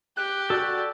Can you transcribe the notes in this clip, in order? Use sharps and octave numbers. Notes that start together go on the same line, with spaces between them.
G4 F#6
F#4 A4 D5 F#6